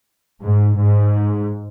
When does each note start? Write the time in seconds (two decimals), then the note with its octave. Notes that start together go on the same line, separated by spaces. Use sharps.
0.43 G#2
0.79 G#2